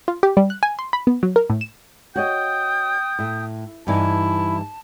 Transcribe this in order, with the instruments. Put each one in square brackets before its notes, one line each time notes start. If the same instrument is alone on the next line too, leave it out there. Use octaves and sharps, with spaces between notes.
[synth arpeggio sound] F4
G4
G3
F#6
G#5
C6
B5
B3
F#3
A#4
A2
E7
[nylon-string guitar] F#4 C#5 D#5 [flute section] G5 D#6 G6
[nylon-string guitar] A2
[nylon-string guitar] G2 E3 D#4 [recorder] E4 [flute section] A5